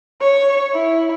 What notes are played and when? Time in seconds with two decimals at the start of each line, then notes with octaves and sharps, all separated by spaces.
0.21 C#5
0.72 E4